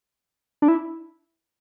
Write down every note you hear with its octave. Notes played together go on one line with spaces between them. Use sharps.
D4
E4